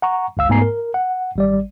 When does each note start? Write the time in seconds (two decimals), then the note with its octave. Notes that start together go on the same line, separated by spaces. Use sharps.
0.02 F#5 A#5 C#6
0.37 G1 C#2 F5 E6
0.49 G#2 A3 B3 G#5 A#5 C7
0.62 A#4
0.94 F#5
1.36 G#1 G3 D5